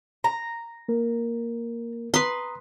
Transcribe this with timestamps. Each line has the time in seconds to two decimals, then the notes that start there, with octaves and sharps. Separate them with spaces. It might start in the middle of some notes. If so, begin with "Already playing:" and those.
0.24 A#5
0.88 A#3 A#4
2.14 B4 A#5 C6 D#6